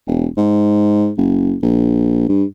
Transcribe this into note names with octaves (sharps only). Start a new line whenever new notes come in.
E1
G#2
F#1
A#1
G2